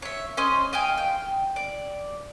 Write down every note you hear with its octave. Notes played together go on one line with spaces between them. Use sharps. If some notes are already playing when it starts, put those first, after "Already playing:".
C#5 E5
C#4 C5 D#5 C6
D#5 F5 G5 G#5
G5
D5